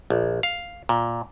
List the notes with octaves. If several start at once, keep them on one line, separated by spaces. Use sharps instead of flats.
A#1
F5
A#2